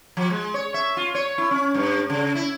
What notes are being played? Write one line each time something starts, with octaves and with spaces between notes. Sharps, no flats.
F3
G#3
C#5
E5
F4
C#5
E4
C#4
G2
C#3
E4